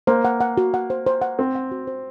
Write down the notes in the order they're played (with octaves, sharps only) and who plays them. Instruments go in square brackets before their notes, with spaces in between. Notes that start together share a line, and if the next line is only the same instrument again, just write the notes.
[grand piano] A#3 [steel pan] C5
[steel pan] F#5
F#5
F#4
F#5
C5
C5
F#5
[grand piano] C4 [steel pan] C5
[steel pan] F#5
F#4
C5